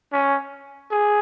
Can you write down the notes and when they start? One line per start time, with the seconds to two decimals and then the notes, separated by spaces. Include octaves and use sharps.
0.12 C#4
0.91 G#4